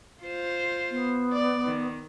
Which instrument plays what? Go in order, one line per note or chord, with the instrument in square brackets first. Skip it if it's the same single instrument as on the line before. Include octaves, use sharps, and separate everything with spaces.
[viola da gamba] F4 C5
[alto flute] B3
[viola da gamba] D5
D#3